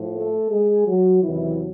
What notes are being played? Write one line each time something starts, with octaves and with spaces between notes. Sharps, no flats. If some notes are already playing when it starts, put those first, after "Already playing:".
Already playing: A2 F3
A3 A4
G#3 G#4
F#3 F#4
E2 C3 D#3 E3 F#3 E4